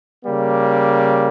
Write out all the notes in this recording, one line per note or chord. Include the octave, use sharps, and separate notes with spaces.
C#3 G3 A#3